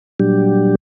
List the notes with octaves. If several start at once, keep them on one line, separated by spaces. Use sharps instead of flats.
A#2 F#3 G3 D4 G4